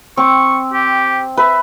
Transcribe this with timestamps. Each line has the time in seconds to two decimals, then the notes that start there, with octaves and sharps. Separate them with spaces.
0.17 C4 C#6
0.73 G4
1.37 B4 E5